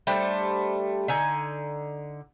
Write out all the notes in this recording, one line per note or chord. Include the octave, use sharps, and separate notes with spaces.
G3 A3 D4 C5
D3 D#4 G#5